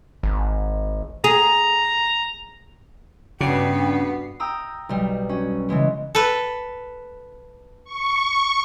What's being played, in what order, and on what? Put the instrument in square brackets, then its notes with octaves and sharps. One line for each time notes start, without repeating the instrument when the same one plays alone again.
[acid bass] G#1
[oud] G#4 [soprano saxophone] A#5
[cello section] G2 B3 [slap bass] C#3 [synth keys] D4 F#4 C7 [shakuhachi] G5
[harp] G5 A#5 D#6 E6
B1 G3
C#4 F#4
C#3 E3 G#3 B3
[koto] A4 B4
[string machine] C#6